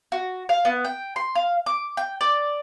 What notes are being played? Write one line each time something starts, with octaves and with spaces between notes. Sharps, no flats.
F#4
F5
B3
G5
C6
F5
D6
G5
D5